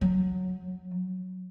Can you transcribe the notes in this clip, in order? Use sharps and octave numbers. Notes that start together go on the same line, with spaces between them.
F#3